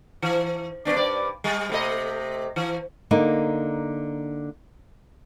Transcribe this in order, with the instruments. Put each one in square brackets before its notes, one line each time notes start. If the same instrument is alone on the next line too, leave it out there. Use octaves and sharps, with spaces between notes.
[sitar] E3
G2 B3 D4
G2 D5
G3
C3 A3 D#5
E3
[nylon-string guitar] D3 A#3 D#4